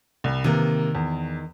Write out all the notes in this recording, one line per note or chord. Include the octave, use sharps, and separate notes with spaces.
C2
C3 D#3 A#3 A#4
E2